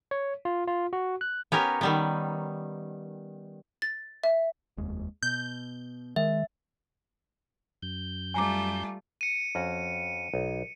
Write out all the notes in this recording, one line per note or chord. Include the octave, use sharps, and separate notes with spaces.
C#5
F4
F4
F#4
F#6
B3 C#4 G4 A#4
D#3 G3 B3
A6
E5
F1 D#2 G#3
B2 G6
D#3 G#3 E5
F#2 G6
G3 A3 F4 G#5 A#5 D6
C#7 D#7
F2 C#4 F#4
B1